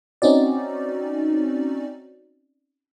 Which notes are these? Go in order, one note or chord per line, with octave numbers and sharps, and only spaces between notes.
C4 C#4 D#4 F#4 D5